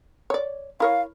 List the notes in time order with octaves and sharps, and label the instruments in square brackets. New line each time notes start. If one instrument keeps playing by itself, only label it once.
[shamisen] C#5 D5
[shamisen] E4 A#4 C#5 [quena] F5